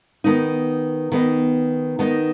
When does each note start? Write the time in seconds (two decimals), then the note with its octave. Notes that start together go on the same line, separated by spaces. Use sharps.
0.24 D#3 B3 D#4
1.12 D#3 B3 D#4
1.99 D#3 B3 D#4